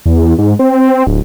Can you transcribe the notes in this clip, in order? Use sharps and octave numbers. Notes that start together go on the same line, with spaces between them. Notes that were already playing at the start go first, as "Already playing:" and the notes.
E2
G#2
C4
D1